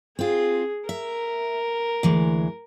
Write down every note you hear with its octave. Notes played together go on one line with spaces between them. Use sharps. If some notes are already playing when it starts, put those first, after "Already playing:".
C4 F4 G#4
A#4 E5
D2 E3 G#3